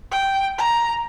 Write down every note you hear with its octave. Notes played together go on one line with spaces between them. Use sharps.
G5
A#5